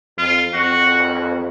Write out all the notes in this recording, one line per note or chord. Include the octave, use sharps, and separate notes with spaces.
F2 F4
F2 F#4